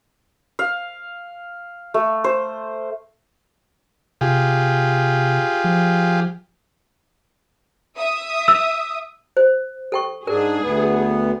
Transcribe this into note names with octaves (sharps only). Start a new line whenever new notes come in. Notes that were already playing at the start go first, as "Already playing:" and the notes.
F5
A3
C5
C3 F4 G4 G#4
F3
E5 D#6
E6
C5
A4 G5 C#6
G#2 D4 G#4 A#4
D2 B3